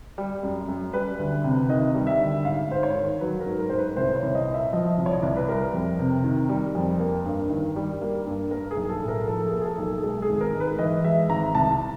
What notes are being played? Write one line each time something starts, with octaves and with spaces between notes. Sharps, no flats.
G3
F#2
F#2
G3 B4
D2
C3
D#3 D#5
G3
E5
D2
G#2 F5
G#2 C5
C#5
D#3
F#3 B4
A#4
G#2
A#4
G#2 C5
B4
C2 C5
C#5
C2
D#5
A#2
E5
F3 D#5
C2
C#5
D5
C2
B4
G3 A#4
F2
C3
D#3
G3
F2
A#3
G2
D#3
G3
A#3
G2
A#3 A#4
G#4
B1
A4
A2
A#4
F3 A4
G#4
A#3
G#4
A4
B1
G#4
G#3 A4
G#4
G#1
A#4
G#2
B4
E3 D#5
G#3 E5
G#1 A#5
C2 A5